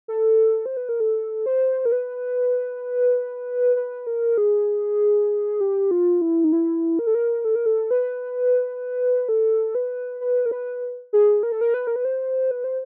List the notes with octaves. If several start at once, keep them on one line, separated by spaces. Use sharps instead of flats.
A4
C5
B4
A#4
A4
C5
A#4
B4
B4
A#4
G#4
G4
F4
E4
D#4
E4
A#4
A4
A#4
A4
A#4
A4
B4
A4
B4
B4
A#4
B4
G#4
A#4
A4
A#4
B4
A#4
B4
C5
B4
C5